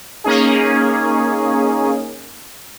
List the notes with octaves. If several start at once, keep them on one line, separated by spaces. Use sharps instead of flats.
A#3 C#4 D#4 G#4